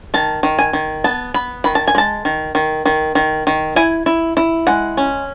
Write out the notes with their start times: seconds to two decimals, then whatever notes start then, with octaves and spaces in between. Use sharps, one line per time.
0.14 D#3 A5
0.43 D#3
0.59 G#5
0.73 D#3
1.04 B3 A5
1.34 B3 B5
1.64 D#3 B5
1.75 A5
1.88 G#5
1.95 G#3 A5
2.25 D#3
2.55 D#3
2.85 D#3
3.15 D#3
3.47 D#3
3.76 E4 G#5
4.06 E4
4.37 E4
4.67 G#3 F#5
4.97 C#4